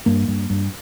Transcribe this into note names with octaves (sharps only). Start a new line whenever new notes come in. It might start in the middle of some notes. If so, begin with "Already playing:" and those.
G2 A#3
G2
G2